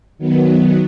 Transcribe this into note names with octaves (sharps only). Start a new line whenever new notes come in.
D#3 F#3 B3